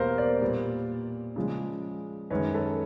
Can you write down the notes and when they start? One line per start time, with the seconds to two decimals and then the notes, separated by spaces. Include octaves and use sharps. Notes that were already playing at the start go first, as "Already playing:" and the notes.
Already playing: E2 B2 G3 A#3 A#4 C5 F5
0.18 C5 D5
0.41 A#2 G3 B3
1.36 C#3 F3 G#3
2.30 F#2 D#3 G#3 C#4 B4 C#5
2.54 A4 B4